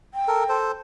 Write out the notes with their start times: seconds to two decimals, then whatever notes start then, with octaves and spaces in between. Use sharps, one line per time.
0.14 G5
0.28 A4 A#4
0.49 A4 C5